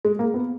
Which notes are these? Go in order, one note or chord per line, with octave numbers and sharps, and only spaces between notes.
G#3
A#3
B3